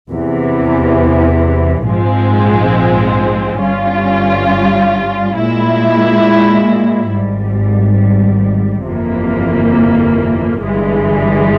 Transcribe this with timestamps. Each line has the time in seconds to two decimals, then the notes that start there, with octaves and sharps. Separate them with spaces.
0.11 E2 C3 E3
1.86 A#1 G#2 F3 G#3 C4
3.61 G1 G2 G3 C#4 F4
5.36 A#2 G#3 E4
7.11 G#1 G#2 G3
8.86 G1 F2 C3 E3 A#3
10.60 G1 G2 E3 G#3